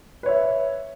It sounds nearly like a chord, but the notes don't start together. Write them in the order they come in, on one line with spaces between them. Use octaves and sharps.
B4 C#5 E5